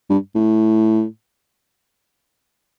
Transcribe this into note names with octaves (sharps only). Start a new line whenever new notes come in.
G2
A2